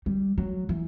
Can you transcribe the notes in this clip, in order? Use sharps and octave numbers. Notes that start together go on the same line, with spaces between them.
G3
F#3
E3